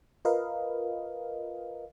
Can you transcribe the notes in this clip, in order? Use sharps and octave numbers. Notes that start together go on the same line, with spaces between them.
F4 A#4 B4 D#5 F5